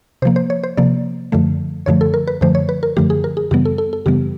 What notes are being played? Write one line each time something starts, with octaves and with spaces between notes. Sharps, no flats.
C3 F3 A#3 C5
C5
C#5
C5
C3 F3 A#3 D5
F#2 D3 F3 A3
F#2 D3 F3 A3 C#5
A4
A#4
B4
F#2 D3 F3 A3 C5
C#5
B4
A#4
F#2 D3 F3 A3 G4
G#4
A#4
G#4
F#2 C#3 E3 G3 B3 G4
A4
A4
A4
F#2 C#3 E3 G3 B3 G4